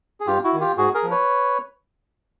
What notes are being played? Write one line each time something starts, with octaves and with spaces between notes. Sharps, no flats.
G#4
G2 F4 G4
E4 F#4
D#3
F4 G4
G#2 F#4 G#4
G#4 A#4
F3
B4 C#5